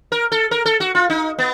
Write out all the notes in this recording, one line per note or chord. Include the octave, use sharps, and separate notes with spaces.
A#4
A4
A#4
A4
F#4
F4
D#4
B3